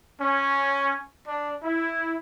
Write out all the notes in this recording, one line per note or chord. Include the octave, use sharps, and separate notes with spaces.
C#4
D4
E4